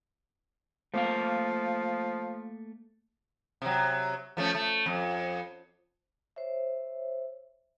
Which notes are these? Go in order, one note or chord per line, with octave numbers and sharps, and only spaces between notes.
F3 A3 A#3 F5
C3 F#3
F3 A3 C#4
A3
F2
C5 C#5 E5